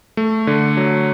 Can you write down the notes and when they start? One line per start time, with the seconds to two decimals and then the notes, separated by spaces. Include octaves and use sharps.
0.17 A3
0.47 D3
0.77 F#3